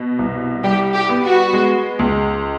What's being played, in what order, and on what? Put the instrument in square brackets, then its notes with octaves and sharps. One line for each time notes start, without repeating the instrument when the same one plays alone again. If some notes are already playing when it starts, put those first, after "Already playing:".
Already playing: [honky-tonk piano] B2
C2
[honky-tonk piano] G3 [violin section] G4
[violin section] G4
[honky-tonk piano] B3
[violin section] F#4
[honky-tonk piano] G#3
C#2